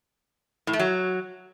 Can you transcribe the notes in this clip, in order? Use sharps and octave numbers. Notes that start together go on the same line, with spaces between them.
A2
A3
F#3